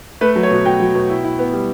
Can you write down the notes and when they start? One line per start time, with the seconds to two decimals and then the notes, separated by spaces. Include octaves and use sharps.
0.21 A3 B4
0.36 F#3
0.43 C#5
0.51 B2
0.65 B2 G5
0.80 F#3
0.95 B2
1.10 E4
1.24 E4
1.39 B3
1.53 G3